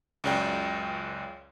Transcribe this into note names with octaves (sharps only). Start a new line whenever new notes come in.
C#2 F#2 C#3 D5 G5